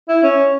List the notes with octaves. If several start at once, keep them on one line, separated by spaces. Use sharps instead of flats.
E4
C#4